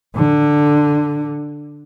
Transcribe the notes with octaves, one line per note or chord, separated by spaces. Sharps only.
D3